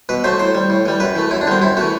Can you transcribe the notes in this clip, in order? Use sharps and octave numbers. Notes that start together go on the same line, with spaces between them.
B2 B4
F#3 A3 C5
A2 C5
G3
A2
E3 G3
F#2 B4
E3 A3
F#2 E4
D4
D3 G3 C4
F#2 E4
E3 A3 F#4